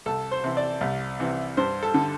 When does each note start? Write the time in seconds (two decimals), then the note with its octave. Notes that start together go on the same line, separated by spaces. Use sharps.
0.06 C2 A4
0.31 C5
0.44 C3 E3
0.57 D5
0.81 C2
1.20 C3 E3
1.57 G2 C5
1.83 A4
1.94 D3